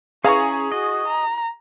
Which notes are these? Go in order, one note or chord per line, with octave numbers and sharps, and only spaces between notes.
E3 C#4 G#4 F5 G#5 A#5 C#6
F#4 D#5
A#5